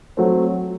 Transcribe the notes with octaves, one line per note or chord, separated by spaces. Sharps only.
F#3 A3 C4